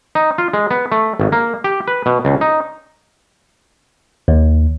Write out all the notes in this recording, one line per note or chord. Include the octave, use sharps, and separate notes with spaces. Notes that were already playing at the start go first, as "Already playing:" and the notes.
D#4
F4
G#3
B3
A3
G#1
A#3
G4
B4
B2
C#2
D#4
D#2